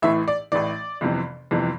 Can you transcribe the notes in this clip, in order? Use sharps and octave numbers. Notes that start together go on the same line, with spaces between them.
A1 A2 E3 E5
D5
A1 A2 E3 D5
G1 F2 C3 E3
G1 F2 C3 E3